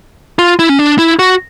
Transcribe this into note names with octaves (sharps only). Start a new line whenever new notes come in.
F4
E4
C#4
D4
E4
F#4